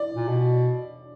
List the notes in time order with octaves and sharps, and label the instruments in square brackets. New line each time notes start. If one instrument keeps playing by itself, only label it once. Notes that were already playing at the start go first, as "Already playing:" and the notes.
Already playing: [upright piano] D5
[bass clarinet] A#2
B2